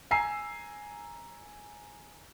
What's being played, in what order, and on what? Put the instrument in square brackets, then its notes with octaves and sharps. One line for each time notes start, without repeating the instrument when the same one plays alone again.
[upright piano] G#5 A#5 E6 C7